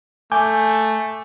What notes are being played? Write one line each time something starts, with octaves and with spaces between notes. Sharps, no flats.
A3 G#5 D6 G6